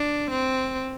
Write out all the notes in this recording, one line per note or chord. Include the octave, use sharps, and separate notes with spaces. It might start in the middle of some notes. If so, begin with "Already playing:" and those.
Already playing: D4
C4